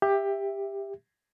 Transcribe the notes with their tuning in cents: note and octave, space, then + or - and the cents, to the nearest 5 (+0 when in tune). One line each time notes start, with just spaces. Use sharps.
G4 +15 E5 +5